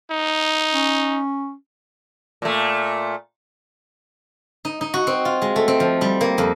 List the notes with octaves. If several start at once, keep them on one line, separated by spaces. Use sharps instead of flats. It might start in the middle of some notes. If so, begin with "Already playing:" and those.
D#4
C#4
A#2 A3
D#4
D#4
F#4
C4
F4
G#3
A3
C4
F3
G3
A#3
F2